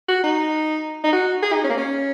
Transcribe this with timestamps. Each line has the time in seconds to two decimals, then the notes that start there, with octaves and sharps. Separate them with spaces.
0.08 F#4
0.23 D#4
1.04 D#4
1.12 F#4
1.43 G#4
1.53 D#4
1.64 C#4
1.70 A#3
1.77 C#4